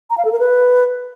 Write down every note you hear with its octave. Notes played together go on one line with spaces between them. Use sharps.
A#5
F5
A4
A#4
B4